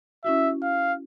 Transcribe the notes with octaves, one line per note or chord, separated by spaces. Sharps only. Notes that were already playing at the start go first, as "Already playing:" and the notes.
C#4 E4 F#4 E5
F5